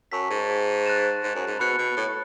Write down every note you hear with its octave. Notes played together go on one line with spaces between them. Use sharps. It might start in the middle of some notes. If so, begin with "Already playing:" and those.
F#2 A5 C#6 E6 B6
G#2
F#6 A6 E7
G#2
F#2
G#2
B2 B5 F#6 C#7
B2
A2